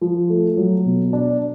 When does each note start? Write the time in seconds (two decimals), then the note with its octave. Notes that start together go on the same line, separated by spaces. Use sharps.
0.01 F3
0.29 A3
0.57 F#3
0.85 B2
1.13 D4